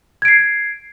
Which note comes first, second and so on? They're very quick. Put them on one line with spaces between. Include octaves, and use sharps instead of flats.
G#6 D7 C7